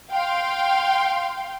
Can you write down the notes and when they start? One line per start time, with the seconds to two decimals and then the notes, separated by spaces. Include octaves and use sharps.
0.12 F5 G5 C6